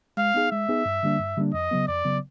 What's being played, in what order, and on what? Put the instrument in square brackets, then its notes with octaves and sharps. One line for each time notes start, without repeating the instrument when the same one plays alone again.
[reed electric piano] G#3 [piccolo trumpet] F5
[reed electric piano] B3 D#4 G#4
[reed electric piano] G#3 [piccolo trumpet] E5
[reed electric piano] B3 D#4 G#4
G2
D3 G3 A#3 D4
G2
D3 G3 A#3 D4
[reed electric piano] F2 [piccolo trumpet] D#5
[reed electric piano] C#3 F#3 B3
[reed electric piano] F2 [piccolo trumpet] D5
[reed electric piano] C#3 F#3 B3